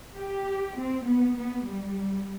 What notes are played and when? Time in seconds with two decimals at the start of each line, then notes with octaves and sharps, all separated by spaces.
0.16 G4
0.77 C4
1.07 B3
1.36 B3
1.68 G3